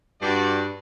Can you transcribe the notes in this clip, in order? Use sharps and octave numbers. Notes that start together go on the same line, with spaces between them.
G2 F#4 D5